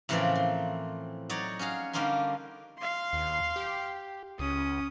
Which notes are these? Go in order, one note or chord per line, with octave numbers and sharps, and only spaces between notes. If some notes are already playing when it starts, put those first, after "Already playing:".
A2 C#3 E3 F3 A#3 C4
C6
F#3 D#4 C#5 D5
C#4 F#4 G#4 F5
D3 G3 A#3 C#4 D#4 C6
F5 C6
D#2
G4
C#2 C#4 D#6